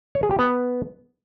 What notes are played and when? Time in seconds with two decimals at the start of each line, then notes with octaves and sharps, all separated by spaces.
0.15 C#5
0.23 G#4
0.31 G4
0.39 B3